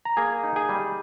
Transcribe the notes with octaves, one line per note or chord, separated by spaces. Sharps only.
A#5
A#3 G#4 G#5
D#4
G#4 G#5
G3